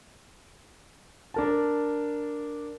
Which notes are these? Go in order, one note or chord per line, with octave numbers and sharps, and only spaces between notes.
D4 A#4 A5